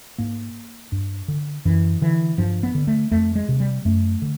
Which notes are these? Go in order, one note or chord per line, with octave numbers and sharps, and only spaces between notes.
G#2 A#3
G2
D3
F#2 E3
D3 E3
G2 F3
B3
D3
A3
F2 A3
G#3
C3
G3
F#2 A3
D3